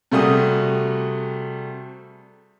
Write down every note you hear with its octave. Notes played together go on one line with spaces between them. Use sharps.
C3 G3 A3 F#4 G#4 D#6